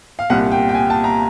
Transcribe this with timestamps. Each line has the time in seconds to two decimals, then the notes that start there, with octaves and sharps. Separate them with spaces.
0.19 F5
0.30 C2 A#2 G3 F#5
0.52 G5
0.69 G5
0.75 G#5
0.90 A5
1.04 A#5